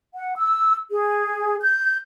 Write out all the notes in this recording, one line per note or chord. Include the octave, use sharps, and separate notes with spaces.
F#5
E6
G#4
G6